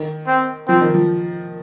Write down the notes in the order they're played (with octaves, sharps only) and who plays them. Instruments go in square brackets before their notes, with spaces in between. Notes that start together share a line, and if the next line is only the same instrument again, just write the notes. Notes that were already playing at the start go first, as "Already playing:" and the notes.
Already playing: [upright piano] D#3
[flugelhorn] C4
[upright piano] F3 [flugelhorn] C4
[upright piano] D#3
F3